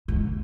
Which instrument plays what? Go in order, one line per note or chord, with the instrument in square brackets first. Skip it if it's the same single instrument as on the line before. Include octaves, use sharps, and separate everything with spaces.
[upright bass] G#2